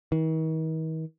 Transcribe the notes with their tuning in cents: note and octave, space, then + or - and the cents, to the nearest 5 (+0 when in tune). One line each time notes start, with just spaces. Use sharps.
D#3 +45